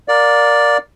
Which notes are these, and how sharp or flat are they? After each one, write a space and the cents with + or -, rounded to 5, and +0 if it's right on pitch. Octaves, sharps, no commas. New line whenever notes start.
A#4 +0 D5 +0 F5 +30